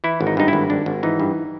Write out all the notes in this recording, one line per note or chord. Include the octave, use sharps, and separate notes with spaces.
E3 E4
G#1
D#4
G2 D#4
G#1 E4
G#1 D4
G#1
E3 D#4
G2